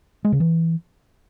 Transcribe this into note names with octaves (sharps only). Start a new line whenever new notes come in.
G#3
C#3
E3